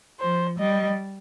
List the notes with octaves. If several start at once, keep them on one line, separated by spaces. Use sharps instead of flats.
F3 C5
G3 D#5